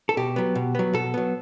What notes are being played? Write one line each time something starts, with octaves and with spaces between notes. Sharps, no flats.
A4
B2 G4
F#3 B3
B2
F#3 B3
B2 A4
F#3 B3